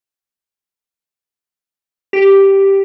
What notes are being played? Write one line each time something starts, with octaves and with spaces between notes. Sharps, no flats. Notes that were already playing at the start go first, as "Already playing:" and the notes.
G4